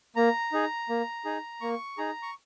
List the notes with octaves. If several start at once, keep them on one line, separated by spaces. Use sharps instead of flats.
A#3 A#5
D#4 G#4
A#3
D#4 G#4
A#3 C#6
D#4 G#4 A#5
C#6